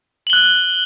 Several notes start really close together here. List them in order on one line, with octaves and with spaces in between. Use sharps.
F#7 G7 F#6